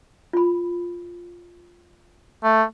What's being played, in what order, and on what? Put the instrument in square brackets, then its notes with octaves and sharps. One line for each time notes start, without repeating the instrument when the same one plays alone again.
[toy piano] F4 B5
[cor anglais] A3